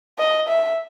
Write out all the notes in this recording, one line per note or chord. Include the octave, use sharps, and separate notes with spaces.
D#5
E5